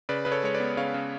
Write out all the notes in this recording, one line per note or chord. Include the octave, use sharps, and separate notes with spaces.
C#3 B4 D5
C#3 B4
A4 C#5
G#3 C#5
B4 D5
B3
C#3 C#5 F5
C#3